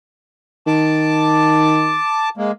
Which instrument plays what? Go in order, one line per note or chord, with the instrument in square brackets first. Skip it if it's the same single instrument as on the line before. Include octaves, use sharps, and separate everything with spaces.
[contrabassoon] D#3 [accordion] A5 D6
[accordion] G#3 A#3